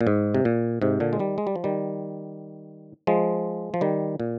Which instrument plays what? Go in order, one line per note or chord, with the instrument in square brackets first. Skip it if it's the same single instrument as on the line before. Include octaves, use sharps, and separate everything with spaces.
[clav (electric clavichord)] A#2
G#2
C3
A#2
G#2 C3
A#2 D3
G#3
D#3 G3
G#3
G3
F3
D#3 G3
F3 G#3
F3
D#3 G3
A#2